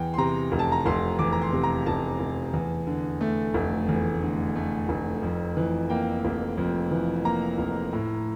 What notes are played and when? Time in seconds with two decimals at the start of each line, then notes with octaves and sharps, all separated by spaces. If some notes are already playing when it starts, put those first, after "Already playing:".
Already playing: E2 G5
0.14 C6
0.18 C3 A#5
0.52 F1
0.59 A5
0.72 A#5
0.86 F1 C6
1.19 E2 D6
1.32 A#5
1.41 C6
1.53 C3
1.63 A#5
1.86 F1 A5
2.20 F1
2.54 E2
2.87 D3
3.21 A3
3.54 F1
3.89 E2
4.22 D3
4.55 A3
4.89 F1
5.23 F2
5.57 E3
5.90 A#3 G5
6.24 F1
6.57 F2
6.91 E3
7.25 A#3 A#5
7.58 F1
7.93 A2